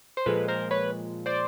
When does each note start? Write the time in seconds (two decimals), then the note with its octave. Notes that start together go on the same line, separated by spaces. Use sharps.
0.17 C5
0.26 A#2 F3 G#3 A4 B4
0.48 A#4 C5
0.71 B4 C#5
1.26 C5 D5